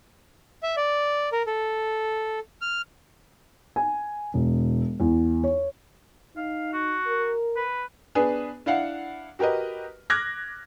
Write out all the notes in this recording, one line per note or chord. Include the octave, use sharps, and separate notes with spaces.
E5
D5
A#4
A4
F6
G#5
E1
E2
C#5
D#4 F5
F#4
A#4
B4
B3 D4 G#4 B4
D4 E4 F5 F#5
F#4 G4 A#4 B4 D#5
D6 F6 F#6 G#6 A#6